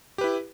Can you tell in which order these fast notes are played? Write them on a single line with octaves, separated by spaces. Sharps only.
G4 B4 E4